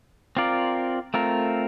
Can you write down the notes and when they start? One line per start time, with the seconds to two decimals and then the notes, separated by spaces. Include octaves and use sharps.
0.37 C4 F4 A#4 D5
1.14 A3 C4 F4 A#4